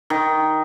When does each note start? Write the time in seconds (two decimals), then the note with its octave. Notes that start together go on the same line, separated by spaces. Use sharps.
0.10 D#3